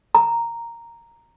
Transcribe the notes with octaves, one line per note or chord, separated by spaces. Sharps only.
A#5